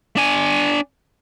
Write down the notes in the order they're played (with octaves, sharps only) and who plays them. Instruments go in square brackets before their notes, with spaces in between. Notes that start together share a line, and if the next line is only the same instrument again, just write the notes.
[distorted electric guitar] D4 G#5